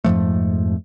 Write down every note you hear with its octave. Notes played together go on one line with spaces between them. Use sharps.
F2 G#2 F3 A3